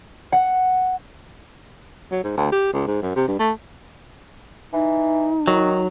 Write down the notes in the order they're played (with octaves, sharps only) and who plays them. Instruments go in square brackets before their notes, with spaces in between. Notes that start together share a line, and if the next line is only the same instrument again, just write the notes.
[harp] F#5
[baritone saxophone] F#3
G#2
D2
G4
C#2
G#2
F#2
C3
G2
A3
[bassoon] E3 [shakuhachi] D#4
[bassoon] D#3 [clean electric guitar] F#3